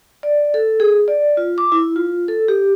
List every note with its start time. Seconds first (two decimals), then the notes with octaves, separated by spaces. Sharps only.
0.23 D5
0.54 A4
0.80 G#4
1.08 D5
1.37 F4
1.58 D6
1.72 E4
1.96 F4
2.28 A4
2.48 G4